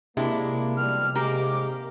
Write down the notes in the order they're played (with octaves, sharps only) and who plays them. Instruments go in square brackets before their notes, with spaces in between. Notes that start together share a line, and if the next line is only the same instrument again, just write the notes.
[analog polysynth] C3 [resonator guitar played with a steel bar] G#3 D4 E4 [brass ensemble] A#3
[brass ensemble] B2 F3 G3 [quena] F6
[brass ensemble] G#2 G#3 [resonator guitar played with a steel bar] A#3 G4 A#4 [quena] D6